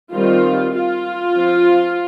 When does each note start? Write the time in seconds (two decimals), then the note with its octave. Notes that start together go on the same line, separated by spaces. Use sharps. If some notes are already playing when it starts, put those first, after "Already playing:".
0.14 D#3 G3 C4 F4
0.75 F4
1.36 F3 C4